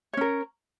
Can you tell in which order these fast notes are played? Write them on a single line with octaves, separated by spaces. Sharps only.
C#5 C#4 A#4